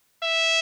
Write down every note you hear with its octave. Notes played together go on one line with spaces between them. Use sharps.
E5